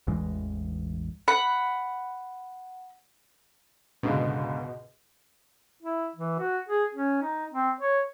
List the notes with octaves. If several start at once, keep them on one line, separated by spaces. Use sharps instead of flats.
A1 E2 E3 G#3
F#5 B5
C#2 G#2 B2 D3
E4
E3
F#4
G#4
C#4
D#4
C4
C#5